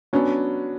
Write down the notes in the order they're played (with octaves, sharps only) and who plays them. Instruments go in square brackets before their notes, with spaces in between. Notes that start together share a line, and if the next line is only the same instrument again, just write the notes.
[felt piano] F#3 B3 D4 [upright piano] C#4